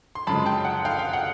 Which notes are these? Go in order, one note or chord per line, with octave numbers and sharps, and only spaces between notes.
C6
F#2 C#3 F3 G#3 A5 B5
G5 A5
F#5
F5 G5
F5 G5
F#5